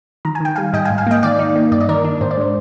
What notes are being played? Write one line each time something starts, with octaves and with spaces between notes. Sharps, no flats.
D#3 A#5
G#5
D#3 G5
G3 F5 G#5
G#2 D#5 G5
F5 G#5
G#2
F5 G#5
A#3 D#5 G5
D#3 D5 F5
D#4
A#3
G2 D5
D#5
D#3 A#4 D5
D4
G#2 C5
D5
G#3 C5